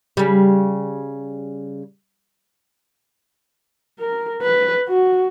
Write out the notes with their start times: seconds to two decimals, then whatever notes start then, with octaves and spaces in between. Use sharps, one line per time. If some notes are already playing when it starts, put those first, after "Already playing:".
0.17 C#3 G3
4.00 A#4
4.42 B4
4.88 F#4